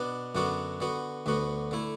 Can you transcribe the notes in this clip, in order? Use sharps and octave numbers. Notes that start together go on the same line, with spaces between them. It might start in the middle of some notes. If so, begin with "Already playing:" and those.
Already playing: B2 B3 D4
F#2 D3 B3 D4 F#4
D3 B3 F#4
D2 D3 B3 F#4
D3 A3 E4